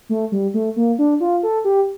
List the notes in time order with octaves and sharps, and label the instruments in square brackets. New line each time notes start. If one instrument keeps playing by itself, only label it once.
[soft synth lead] A3
G3
A3
A#3
D4
F4
A4
G4